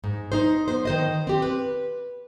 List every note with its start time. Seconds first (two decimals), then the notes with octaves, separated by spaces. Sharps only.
0.04 G#2
0.32 D#4 C5
0.68 B3 C5
0.85 D#3 C5 D#5
1.27 C4 G4
1.42 B4